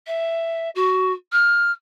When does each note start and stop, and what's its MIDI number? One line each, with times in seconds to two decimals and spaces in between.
0.07 0.69 76
0.75 1.12 66
1.32 1.71 89